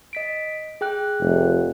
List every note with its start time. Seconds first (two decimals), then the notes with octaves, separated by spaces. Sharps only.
0.13 D#5 B6 D7
0.81 G#4 G5 F#6
1.20 F1